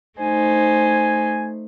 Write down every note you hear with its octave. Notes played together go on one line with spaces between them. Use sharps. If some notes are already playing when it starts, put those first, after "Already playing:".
A3 D#4 C5 G#5